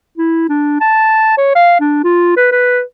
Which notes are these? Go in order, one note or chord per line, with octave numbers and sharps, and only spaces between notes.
E4
D4
A5
C#5
F5
D4
F4
B4
B4